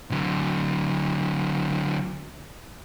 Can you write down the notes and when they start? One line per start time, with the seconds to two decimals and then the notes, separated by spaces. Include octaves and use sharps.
0.11 D3 F#3